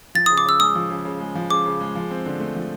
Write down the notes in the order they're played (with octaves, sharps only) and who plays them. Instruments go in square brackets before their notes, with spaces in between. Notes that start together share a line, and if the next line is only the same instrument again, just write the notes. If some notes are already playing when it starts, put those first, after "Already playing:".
[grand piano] F3 [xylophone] A6
[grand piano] C#3 [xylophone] D#6
[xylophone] D6
[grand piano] C#3 [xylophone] E6
[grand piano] G#3 [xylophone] D#6
[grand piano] F3
C#3
C#3
G#3
F3
[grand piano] C#3 [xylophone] D6
[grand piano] C#3
G#3
F3
C4
D3
A3
F3